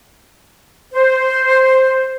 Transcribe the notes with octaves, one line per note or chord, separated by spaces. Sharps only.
C5